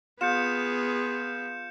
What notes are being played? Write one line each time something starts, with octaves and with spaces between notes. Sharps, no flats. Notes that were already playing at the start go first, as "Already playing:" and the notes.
B3 F4 G#4 G6 C#7 E7